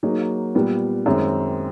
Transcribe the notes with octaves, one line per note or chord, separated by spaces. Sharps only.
F#3 A#3 D#4 G#4
A#2 G3 B3
F#2 D#3 G#3 C4